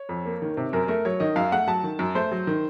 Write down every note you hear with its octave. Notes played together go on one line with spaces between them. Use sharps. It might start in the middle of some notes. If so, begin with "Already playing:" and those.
Already playing: C#5
F2
A#3
D#3
C3
F#2 A#4
A3 A#4
F#3 C#5
D#3 D#5
F#2 F5
A3 F#5
F#3 A5
D#3
F#2
A3 C5
F#3
D#3